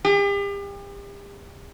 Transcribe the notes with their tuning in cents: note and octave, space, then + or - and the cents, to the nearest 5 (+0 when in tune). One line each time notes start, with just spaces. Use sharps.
G4 +40